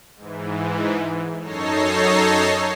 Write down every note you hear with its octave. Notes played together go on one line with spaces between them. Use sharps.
G#2 E3
F#2 D#4 A4 C#5 A#6 C7